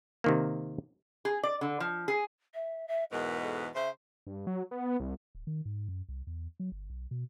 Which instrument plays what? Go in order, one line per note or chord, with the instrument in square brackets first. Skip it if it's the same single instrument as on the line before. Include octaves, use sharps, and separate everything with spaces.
[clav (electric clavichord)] C3 D#3 A#3
[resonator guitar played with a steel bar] G#4
D5
D3
F3
G#4
[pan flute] E5
E5
[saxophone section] E2 G#2 B2 [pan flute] A#4
[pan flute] A4
[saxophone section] C#3 C5 [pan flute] E5
[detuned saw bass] G2
F#3
B3
C2
[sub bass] D1
D#3
G#2
F#2
C2
E2
F#3
G1
B1
B2